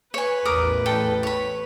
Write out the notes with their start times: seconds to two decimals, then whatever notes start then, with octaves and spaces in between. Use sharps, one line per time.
0.14 B4 C#5 G#5
0.45 A1 E2 A#4 D6 D#6
0.86 A4 G5
1.23 C#5 B5